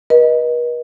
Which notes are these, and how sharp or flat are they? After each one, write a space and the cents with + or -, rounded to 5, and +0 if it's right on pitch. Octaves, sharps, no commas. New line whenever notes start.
B4 -45 D#5 +0